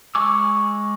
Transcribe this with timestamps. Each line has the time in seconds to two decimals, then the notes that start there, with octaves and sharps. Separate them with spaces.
0.15 G#3 G#5 C#6 D6 E6